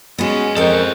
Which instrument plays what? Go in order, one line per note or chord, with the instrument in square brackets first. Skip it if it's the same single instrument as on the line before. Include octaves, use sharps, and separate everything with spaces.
[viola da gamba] G#3 C#4 [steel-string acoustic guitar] B3 F#4
[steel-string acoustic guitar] F2 G5 [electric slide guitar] A4 C5 [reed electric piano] A#4 D#5